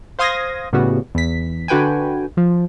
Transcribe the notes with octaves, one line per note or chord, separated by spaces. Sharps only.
C5 F5 C6 D#6 G#6 A#6
A2 C#3 G3 B3 F#4
E2 B6
D3 F#4 B4 G5 G#5
F3